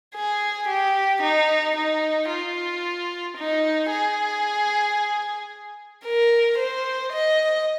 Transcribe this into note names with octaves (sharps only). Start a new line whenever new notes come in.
G#4
G4
D#4
D#4
F4
D#4
G#4
A#4
C5
D#5